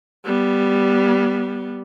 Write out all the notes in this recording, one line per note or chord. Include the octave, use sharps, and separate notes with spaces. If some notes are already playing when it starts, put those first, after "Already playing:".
G3 B3